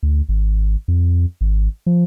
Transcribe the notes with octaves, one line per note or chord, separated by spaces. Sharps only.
D2
G#1
F2
G#1
F3